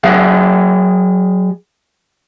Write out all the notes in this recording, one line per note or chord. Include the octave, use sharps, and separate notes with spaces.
F#3 G#4 E5 F#5